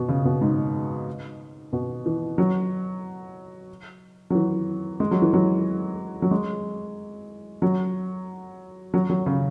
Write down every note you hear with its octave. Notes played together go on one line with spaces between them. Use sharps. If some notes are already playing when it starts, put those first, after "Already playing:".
Already playing: B2
C#3
B2
G#2
B2
E3
F#3
F#3
E3
G#3
F#3
E3
F#3
F#3
G#3
F#3
F#3
F#3
C#3